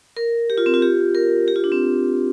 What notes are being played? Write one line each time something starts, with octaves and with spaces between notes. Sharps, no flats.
A#4
G4
F4
C4
F4
G4
A#4
G4
F4
D4
C4